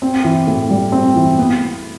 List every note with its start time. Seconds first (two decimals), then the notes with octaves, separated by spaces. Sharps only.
0.02 C4
0.25 E3
0.47 A2
0.71 G3
0.92 C4
1.16 E3
1.39 B3